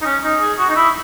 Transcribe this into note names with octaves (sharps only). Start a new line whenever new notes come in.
D#4
C#4
D#4
G#4
F#4
D#4
E4